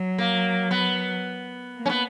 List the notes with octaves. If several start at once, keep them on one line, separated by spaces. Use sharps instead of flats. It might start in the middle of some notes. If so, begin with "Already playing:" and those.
Already playing: F#3
A#3
B3
A#3
C#4
B3